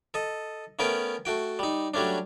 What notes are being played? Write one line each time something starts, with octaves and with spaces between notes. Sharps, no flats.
A4 D#5
A3 B3 C#4 A#4 B4 G5
A3 F#4 G5
G3 D#4
F#3 G3 A3 C#4 D4